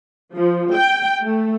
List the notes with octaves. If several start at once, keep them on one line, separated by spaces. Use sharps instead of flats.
F3
G5
A3